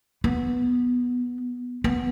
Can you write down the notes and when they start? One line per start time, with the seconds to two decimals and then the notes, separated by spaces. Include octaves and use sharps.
0.24 B3
1.84 B3